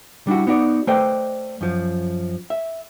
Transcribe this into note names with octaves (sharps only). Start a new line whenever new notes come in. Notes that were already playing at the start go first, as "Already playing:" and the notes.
G3 D4 E4 F#4
B3 D#4 F#4 D5
A3 B4 C5 D5 D#5 G5
F#2 F3
E5